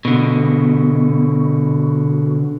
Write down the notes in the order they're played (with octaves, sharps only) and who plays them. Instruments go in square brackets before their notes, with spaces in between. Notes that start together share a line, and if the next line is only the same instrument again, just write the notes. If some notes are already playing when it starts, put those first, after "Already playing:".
[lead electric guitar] B2 D3